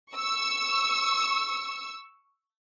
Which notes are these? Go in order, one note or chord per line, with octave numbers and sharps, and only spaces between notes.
C#6 E6